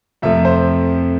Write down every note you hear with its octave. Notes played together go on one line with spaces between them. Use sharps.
F2 C3 F3 A3 E5
C5